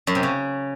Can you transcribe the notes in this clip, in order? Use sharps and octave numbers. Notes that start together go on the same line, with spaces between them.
F#2
C3
C#3